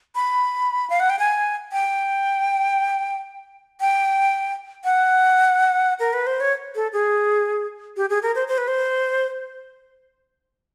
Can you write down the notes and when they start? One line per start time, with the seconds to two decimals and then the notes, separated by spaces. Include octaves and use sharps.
0.15 B5
0.90 F5
1.00 F#5
1.10 G5
1.19 G#5
1.72 G5
3.80 G5
4.84 F#5
6.00 A#4
6.13 B4
6.27 C5
6.40 C#5
6.75 A4
6.93 G#4
7.97 G4
8.10 G#4
8.22 A#4
8.35 C5
8.48 C5
8.58 B4
8.68 C5